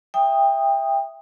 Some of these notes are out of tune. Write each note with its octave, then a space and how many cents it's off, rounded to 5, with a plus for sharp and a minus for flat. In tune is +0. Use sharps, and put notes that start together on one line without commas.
E5 +0 G5 +25 D#6 +0